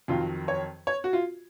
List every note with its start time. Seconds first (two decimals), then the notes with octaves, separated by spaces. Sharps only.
0.08 F2 D#3 F#3 F4
0.48 C#5
0.87 C#5
1.04 F#4
1.13 F4